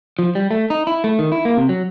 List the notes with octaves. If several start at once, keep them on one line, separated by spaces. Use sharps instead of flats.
F3
G3
A3
D#4
E4
A3
D#3
E4
A#3
C3
F#3